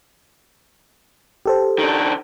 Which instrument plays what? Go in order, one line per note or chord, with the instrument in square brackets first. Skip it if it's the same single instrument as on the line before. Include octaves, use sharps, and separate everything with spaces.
[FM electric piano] G4 A4 C5
[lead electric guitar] D#3 D4